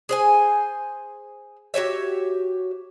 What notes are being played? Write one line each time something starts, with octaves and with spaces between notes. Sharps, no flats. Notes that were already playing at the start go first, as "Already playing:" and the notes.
G#4 C5 G#5
F#4 G4 C#5 E5